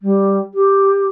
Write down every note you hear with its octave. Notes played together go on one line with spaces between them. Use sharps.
G3
G4